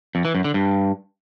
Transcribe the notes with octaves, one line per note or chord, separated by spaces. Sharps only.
F2
E3
F#2
D3
G2